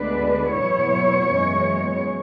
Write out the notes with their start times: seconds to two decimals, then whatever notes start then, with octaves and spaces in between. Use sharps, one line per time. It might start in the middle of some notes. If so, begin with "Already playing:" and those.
Already playing: D2 D3 G#3 B3 D4 B4
0.53 E2 B2 F#3 B3 E4 C#5
1.29 F#2 E3 G#3 B3